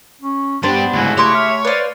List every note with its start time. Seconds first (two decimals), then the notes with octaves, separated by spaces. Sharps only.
0.21 C#4
0.63 G2 B3 D4 G4 C5
0.94 D2 G#2 C#3 E4 F#4
1.18 A3 G4 C#5 C6 D6
1.35 E5 F6
1.65 B4 C5 D5 F5